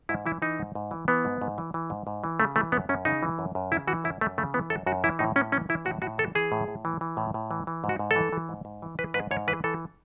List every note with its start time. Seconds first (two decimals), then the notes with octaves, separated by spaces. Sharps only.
0.09 G#2 E4
0.26 E3 E4
0.42 E3 D#4
0.59 G#2
0.75 G#2
0.91 E3
1.08 E3 B3
1.25 G#2
1.42 G#2
1.58 E3
1.74 E3
1.90 G#2
2.07 G#2
2.24 E3
2.40 C#3 A3
2.56 E3 A3
2.72 F#2 B3
2.89 F#2 C#4
3.05 C#3 D#4
3.23 E3
3.39 F#2
3.55 F#2
3.72 C#3 E4
3.87 E3 F#4
4.04 F#2 E4
4.21 F#2 A3
4.38 C#3 A3
4.54 E3 B3
4.70 F#2 A4
4.87 F#2 F#4
5.04 E3 E4
5.19 A2 D#4
5.36 A2 C#4
5.52 E3 C#4
5.69 E3 E4
5.85 A2 F#4
6.02 A2 F#4
6.18 E3 A4
6.35 E3 G#4
6.52 A2
6.68 A2
6.85 E3
7.01 E3
7.17 A2
7.34 A2
7.51 E3
7.67 E3
7.84 G#2
7.89 F#4
7.99 G#2
8.11 A4
8.16 E3
8.33 E3
8.49 G#2
8.65 G#2
8.82 E3
8.99 E3 B4
9.14 G#2 B4
9.31 G#2 C#5
9.48 E3 B4
9.64 E3 A4